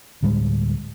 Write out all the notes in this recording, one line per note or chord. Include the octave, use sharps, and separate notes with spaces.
D2 A2 G3 G#3